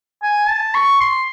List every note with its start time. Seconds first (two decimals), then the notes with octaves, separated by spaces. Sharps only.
0.23 G#5
0.49 A5
0.75 C#6
1.01 C6